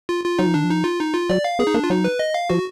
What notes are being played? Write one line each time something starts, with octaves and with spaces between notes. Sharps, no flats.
F4
F4
F#3 D#4
F3
D#3 D4
F3
D#4
F4
D#4
F4
F#3 D5
F5
B3 G#4
D#4
A#3 D4
F4
F#3 D#4
B4
D#5
F5
F3 F#4